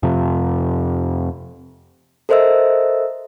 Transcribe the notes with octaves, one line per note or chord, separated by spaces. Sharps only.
F2 C3
A4 A#4 C5 D#5 E5 E6